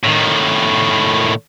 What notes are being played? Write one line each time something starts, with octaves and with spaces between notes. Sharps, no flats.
A2 D#3